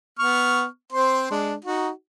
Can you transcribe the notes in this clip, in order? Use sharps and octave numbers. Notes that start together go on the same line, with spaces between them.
B3 C#6 F6
C4 C5 C6
G#3 D4
D#4 F#4